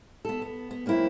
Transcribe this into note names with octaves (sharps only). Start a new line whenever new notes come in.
B3 A4
B3
B3
F#2 A#3 C4 E4